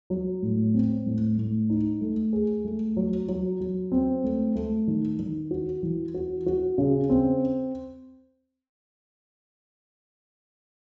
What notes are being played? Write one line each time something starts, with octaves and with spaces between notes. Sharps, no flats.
F#3
A2
C4
A2
A2
D#4
A3
G#4
A3
F#3
F#3
F#3
C4
A3
A3
D#3
D#3
F#4
E3
F#4
F#4
C#3
C4